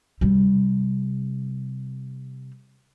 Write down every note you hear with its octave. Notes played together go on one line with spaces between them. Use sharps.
C3 G3